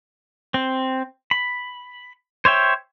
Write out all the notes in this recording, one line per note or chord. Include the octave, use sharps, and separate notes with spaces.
C4
B5
C5 C#5 E5 G5